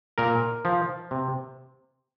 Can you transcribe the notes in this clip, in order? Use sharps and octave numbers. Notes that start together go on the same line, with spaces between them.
A#2 A#4
F3
C3